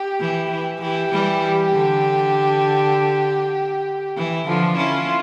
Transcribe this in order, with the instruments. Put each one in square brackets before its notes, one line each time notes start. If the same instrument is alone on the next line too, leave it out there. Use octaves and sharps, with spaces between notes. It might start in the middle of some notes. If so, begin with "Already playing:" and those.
Already playing: [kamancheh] G4
[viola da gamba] E3
E3
[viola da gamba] E3 [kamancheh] G4
[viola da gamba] E3 G3
D3
E3
[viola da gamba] D3 F3 [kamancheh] F4
[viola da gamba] C#4 E4